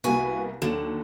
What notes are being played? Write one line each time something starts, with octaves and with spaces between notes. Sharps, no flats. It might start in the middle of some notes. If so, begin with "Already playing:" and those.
C2 A#3 B3 F#4 G#5
D#2 D3 F#3 E7